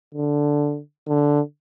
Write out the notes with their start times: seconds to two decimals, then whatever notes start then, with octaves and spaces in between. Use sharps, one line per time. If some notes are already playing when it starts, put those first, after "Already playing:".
0.14 D3
1.08 D3